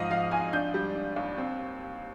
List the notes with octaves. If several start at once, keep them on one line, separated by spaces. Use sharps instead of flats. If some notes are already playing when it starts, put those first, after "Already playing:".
Already playing: G#2 F3 D#5 F5
F3 F5
G#1 G#5
D4 G6
G3
D4
D#2
C4